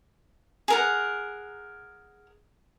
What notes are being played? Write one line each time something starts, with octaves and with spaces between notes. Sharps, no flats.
G#4 A#4 F#5